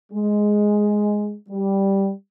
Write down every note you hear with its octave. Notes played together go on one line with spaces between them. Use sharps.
G#3
G3